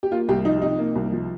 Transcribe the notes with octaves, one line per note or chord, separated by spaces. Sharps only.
G4
A#3 F4
C2 G4
F3 D#4
C3 D#4
A#3
C2
F3